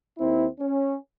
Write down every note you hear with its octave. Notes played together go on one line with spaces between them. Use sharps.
D#2 C4 E4
C#4